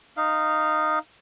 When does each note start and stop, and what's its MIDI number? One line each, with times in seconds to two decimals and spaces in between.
0.17 0.99 63
0.17 0.99 77